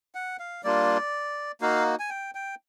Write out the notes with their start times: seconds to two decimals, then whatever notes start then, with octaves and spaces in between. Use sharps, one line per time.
0.15 F#5
0.39 F5
0.64 G3 A#3 D4 F4 D5
1.61 A#3 D#4 F#4 F5
1.99 G#5
2.10 G5
2.35 G5